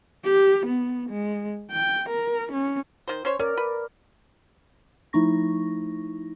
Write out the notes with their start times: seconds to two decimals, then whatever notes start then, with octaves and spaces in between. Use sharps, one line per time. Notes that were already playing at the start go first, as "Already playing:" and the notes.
0.25 G4
0.66 B3
1.10 G#3
1.72 G5
2.09 A#4
2.52 C#4
3.08 D#3 C5
3.25 C#4 C5 C#5
3.39 C#4 A#4 D5
3.57 B4
5.13 F3 A3 D#4 E4 C#6 A#6